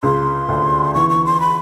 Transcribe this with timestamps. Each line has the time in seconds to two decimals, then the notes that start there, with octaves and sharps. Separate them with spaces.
0.03 C#2 C#3 C6
0.48 D2 D3
0.94 E2 E3 C#6
1.10 C#6
1.25 C6
1.40 B5